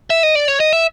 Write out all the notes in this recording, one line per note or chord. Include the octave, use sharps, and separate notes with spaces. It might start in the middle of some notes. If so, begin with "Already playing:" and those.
E5
D#5
D5
C#5
D#5
E5